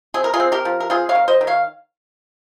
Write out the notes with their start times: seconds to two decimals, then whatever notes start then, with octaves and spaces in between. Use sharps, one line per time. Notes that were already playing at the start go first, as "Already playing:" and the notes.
0.14 C4 G#4
0.24 A#4
0.34 F4 G#4
0.40 C4
0.52 G4 A#4
0.65 F3
0.80 A#4
0.90 C4 F4 G#4
1.09 C#5 F5
1.15 D#3
1.28 C5 D#5
1.41 D#3
1.47 C#5 F5